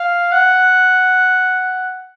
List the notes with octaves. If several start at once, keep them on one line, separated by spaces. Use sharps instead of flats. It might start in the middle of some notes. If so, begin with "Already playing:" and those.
Already playing: F5
F#5